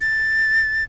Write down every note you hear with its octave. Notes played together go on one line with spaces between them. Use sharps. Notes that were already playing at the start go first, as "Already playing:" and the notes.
A6